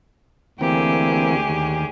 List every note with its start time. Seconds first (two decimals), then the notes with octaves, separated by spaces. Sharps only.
0.61 D2 E3 A#3 C4 G4 G#4
1.49 D#2